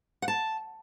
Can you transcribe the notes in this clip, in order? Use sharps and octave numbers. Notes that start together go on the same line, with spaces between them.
F#5
A5